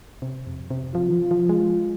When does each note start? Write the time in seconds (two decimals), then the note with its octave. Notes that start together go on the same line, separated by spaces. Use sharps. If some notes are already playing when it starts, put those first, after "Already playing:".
0.22 C3
0.47 F2
0.71 C3
0.95 F3 F4
1.09 D#3
1.13 F3
1.31 F3
1.49 G#3